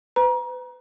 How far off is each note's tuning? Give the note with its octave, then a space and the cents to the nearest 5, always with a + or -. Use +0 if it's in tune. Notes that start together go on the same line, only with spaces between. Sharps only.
B4 +35 A#5 +35